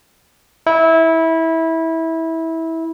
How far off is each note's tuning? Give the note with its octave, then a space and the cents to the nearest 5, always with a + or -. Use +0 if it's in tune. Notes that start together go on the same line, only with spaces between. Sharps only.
E4 -20